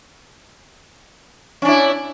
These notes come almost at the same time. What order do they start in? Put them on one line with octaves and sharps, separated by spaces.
C#4 D4 E4